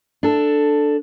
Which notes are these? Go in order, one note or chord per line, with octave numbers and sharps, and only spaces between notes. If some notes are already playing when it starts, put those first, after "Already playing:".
D4 A4